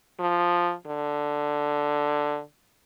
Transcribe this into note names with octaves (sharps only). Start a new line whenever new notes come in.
F3
D3